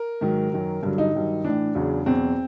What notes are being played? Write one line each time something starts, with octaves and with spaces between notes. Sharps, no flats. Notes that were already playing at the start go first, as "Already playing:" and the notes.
Already playing: A#4
G#2 D#3 F#3
F#2 D#3 F#3
G2 D3 F#3
D#4
G2 D#3 F#3
A2 E3 D4
E2 C#3 F#3
E2 B2 F#3 C4